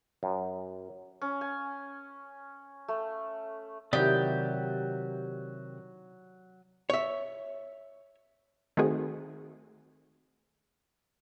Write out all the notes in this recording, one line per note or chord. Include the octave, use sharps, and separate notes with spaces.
F#2
C#4
G#5
A3
C3 D#3 F#3 E4 G4 D5 D#6
C#5 E5
D#3 A3 C4 F#4 G#4